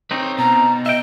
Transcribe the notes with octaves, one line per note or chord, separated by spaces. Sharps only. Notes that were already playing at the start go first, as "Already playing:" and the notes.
C4 D#4 B4 C#5
B2 A#5
D#5 E5 G5